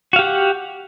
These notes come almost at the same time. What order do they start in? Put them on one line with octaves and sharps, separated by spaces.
F#4 F5 G4 F#5